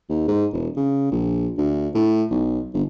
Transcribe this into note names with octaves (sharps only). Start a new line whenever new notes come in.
D#2
G#2
E1
C#3
A#1
D2
A2
B1
G1